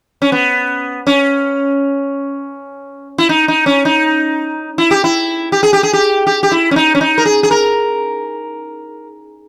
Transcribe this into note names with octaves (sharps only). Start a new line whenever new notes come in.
C#4
B3
C#4
E4
D#4
D#4
C#4
D#4
E4
G4
E4
G4
G#4
G4
G#4
G4
G4
G4
E4
C#4
D#4
C#4
D#4
A#4
G#4
G#4
A#4